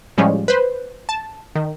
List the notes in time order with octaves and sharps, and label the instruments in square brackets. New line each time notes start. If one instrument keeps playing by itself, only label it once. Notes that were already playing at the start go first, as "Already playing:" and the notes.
[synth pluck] A2 F3 G3 G#3 C#4
B4 C5
A5
D#3